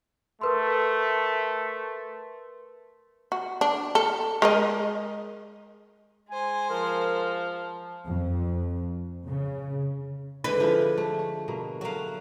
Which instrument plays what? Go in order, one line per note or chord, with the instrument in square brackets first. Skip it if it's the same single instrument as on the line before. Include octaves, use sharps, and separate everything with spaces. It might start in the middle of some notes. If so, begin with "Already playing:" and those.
[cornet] A3 [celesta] A#4 B4 C6
[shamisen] F#4
D4
A4
G#3 A#4 D#5
[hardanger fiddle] G#3 C5 [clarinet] G#5
[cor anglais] F3 [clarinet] A#4
[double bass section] F2
C#3
[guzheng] D3 G#3 [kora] E4 [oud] B4
[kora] F3 E4
A3
C#5
B2 A#3
[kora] F#3 A3 A#3 [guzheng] F#4 F5